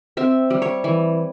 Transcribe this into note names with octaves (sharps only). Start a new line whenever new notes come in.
C4 E5
G3
C#5
E3